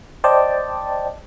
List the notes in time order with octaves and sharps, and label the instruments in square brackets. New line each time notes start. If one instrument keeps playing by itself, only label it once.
[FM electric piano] C5 D5 D#5 G5 A5